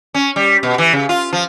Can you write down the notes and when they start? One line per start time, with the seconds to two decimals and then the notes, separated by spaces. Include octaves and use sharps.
0.14 C#4
0.36 G3
0.63 B2
0.78 E3
0.93 C#3
1.09 F4
1.33 F3